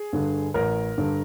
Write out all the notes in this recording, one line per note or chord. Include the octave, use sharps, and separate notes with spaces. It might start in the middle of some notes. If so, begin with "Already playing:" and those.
Already playing: G#4
G2 D3
A1 A#4
G2 D3